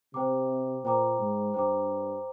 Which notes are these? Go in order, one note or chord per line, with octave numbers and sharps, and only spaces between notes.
C3 C5 G5 A#5 D6
A#2 C5 G5 A#5 D6
G#2
G2 C5 G5 A#5 D6